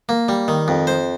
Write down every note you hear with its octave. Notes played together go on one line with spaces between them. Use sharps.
A#3
G3
D#3
F2
C5